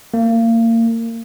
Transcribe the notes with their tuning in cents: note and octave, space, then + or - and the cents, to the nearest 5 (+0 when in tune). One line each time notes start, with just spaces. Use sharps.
A#3 -30